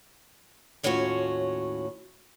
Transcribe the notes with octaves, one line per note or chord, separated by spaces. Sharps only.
D#2 A2 C#4 F4 F#4 C#5